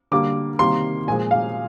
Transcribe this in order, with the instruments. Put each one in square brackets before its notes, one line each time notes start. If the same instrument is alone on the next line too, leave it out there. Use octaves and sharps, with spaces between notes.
[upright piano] D3 G3 A#3 D6
C3 D#3 G3 A#3 C6
A#2 F3 G#3 G#5
F5